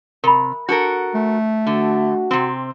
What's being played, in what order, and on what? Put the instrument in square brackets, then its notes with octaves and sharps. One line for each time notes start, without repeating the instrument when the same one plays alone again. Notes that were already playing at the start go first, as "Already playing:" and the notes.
[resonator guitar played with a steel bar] C3 [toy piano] A#4 B5
[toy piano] D4 [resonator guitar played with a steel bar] F#4 A4 A#4
[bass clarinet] A3
[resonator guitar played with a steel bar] D3 [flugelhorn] F#4
[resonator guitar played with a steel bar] C3 C4